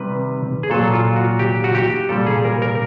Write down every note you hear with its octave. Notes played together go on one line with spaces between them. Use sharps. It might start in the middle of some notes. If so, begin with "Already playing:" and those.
Already playing: C3 D#3 G3 B4
G#4
A#2 F#3 A4
F4
F#4
G4
F#4
G4
A#2 G3 A4
G#4
A#4
A#4